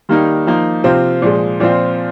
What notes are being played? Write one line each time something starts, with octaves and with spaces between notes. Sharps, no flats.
D#3 G3 A#3 D#4
F3 A#3 D#4
C3 F3 C4 F4
A#2 F3 G#3
A#2 F3 C4 F4